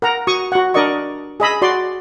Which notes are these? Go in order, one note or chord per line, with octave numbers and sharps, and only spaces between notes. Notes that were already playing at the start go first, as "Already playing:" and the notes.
A#4 F#5 A#5
F#4 C#6 D#6
F#4 F#5
D4 A#4 D5 D#5 C#6
G#4 D#5 B5 E6
F#4 D5 C6